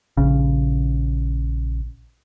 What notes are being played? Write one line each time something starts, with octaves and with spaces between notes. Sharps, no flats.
A#1 C#3